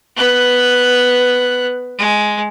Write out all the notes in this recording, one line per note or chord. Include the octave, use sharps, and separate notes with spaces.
B3 F#6
G#3